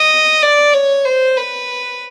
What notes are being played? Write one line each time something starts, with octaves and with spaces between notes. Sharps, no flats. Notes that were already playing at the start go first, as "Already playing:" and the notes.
Already playing: D#5
D5
C#5
C5
B4